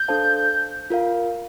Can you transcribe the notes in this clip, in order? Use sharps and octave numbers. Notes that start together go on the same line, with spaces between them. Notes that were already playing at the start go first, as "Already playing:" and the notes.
Already playing: G6
D4 A4 C5 F5 A5
F4 A#4 F5